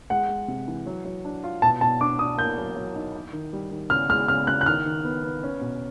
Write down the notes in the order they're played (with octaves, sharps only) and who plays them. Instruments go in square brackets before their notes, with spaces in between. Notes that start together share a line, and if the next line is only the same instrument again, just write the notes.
[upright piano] G#3 [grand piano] F#5
[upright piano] G#3
C3
E3
F#3
F#3
D4
F4
[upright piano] B2 [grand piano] A5
[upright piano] B2 [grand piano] A5
[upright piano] D4 [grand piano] D6
[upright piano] D4 [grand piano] D#6
[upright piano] A#3 [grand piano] G6
[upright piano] F#3
F#3
D#4
E4
D#3
G3
D#3
[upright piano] C#3 [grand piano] F6
[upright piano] G#3 [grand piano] F6
[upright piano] C#3 [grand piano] F6
[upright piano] C#3 [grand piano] F#6
[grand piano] F#6
[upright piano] D#3 [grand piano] F6
[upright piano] D#3
B3
B3
C#4
B2